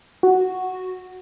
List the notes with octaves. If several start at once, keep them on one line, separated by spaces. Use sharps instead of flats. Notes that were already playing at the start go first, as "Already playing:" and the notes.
F#4